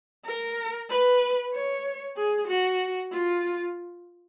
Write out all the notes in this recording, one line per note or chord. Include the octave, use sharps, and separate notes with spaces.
A#4
B4
C#5
G#4
F#4
F4